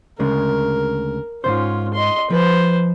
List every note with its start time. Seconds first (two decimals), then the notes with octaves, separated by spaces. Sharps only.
0.19 D2 C#3 G#3 A#4
1.44 G#2 C3 C#4 F4 C5
1.93 D#5 C6
2.30 F3 B4 C5